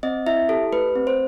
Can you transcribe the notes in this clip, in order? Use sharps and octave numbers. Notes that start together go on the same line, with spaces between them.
C4 D#5
E4 E5
G4 A4
A3 B4
C4
C5